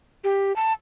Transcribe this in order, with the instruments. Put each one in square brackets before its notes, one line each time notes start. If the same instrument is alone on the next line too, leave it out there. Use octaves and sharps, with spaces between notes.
[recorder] G4
A5